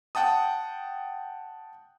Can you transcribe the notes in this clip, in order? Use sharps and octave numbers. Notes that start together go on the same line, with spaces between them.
F#5 G5 A5 D#6